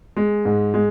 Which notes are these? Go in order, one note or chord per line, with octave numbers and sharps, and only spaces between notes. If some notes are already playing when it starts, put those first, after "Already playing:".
G#3
G#2
G#3